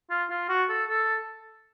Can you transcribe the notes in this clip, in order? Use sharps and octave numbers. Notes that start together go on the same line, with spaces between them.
F4
F4
F#4
A4
A4